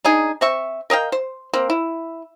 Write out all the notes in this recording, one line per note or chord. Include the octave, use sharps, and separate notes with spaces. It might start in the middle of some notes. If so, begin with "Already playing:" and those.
D4 D#4 G#4
C4 E5 C#6
A#4 D#5 F5 G5
C5
A#3 C4
E4